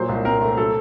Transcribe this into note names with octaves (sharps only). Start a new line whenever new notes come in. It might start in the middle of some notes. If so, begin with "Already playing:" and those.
Already playing: A#2 F#3 C5
C2
C4 A#4
A3
F#3 A4